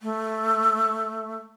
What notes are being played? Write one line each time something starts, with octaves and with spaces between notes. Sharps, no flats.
A3